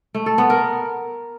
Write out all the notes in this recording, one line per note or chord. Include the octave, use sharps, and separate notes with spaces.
A3
A4
B3
A#4